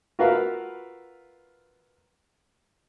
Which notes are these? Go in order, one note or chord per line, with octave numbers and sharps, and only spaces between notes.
F4 F#4 A#4 B4 E5 F5